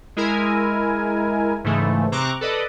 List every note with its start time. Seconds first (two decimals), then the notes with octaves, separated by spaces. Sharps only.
0.16 G#3 E4 A#4 G#5
1.64 G#2 C#3 E3 A3
2.12 C3 C4 A#5 C#6 D6 F#6
2.41 A4 B4 D5 D#5